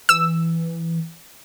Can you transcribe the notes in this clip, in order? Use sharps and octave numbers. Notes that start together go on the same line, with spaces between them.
E3 E6